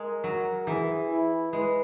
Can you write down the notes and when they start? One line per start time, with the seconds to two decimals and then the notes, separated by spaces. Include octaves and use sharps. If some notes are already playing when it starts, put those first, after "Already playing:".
Already playing: G#3 A#4
0.24 F#3
0.67 E3 G#4
1.09 E4
1.52 G#3 B4